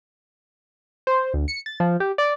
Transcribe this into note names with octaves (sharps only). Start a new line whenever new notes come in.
C5
D2
C#7
A6
F3
G4
D5